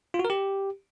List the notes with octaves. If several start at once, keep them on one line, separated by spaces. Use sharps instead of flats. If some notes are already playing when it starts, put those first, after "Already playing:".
F4
F#4
A#4
G4